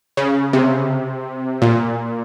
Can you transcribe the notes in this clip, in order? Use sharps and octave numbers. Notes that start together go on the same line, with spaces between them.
C#3
C3
A#2